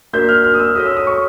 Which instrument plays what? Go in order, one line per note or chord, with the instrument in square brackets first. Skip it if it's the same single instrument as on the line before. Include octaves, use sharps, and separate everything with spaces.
[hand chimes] A#3 D4 F#4 A#4 D5 [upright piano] G6
[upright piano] F6
F6
D#6
E6
[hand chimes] F#4 A4 C#5 [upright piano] D#6
[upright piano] E6
D#6
C#6